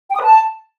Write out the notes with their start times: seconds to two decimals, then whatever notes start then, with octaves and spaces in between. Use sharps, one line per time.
0.10 G5
0.15 D#6
0.20 B4
0.25 A5